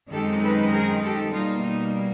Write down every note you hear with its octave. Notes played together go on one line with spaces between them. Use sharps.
F#2 D#3 G#3 C4 D#4 G4 A4
A4 B4
G#4 A#4
G4 A4
B2 G3 A#3 D#4 F4
D#4